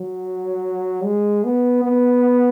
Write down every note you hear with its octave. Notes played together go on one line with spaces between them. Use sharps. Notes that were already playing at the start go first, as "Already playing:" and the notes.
Already playing: F#3
G#3
B3
B3